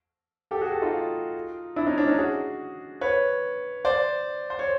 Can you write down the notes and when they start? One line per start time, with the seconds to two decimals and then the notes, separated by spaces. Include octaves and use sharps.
0.51 G4 A4
0.61 F#4 G#4
0.72 G4 A4
0.82 D#4 F4
1.76 D4 E4
1.86 C#4 D#4
1.98 D4
2.07 C#4 D#4
2.18 F#4 G#4
3.01 B4 C#5
3.85 C5 D5
4.50 C5
4.59 C#5